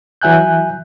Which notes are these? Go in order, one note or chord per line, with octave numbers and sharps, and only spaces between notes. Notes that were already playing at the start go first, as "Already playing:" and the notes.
E3 F#3 E5 G#5 F#6 G6